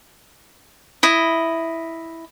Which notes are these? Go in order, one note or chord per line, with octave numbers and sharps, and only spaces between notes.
E4 D#5